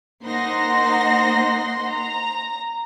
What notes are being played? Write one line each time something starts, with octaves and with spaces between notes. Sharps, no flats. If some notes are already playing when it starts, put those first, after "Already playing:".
A#3 D#4 C5 F#5 C6 A#6
A#5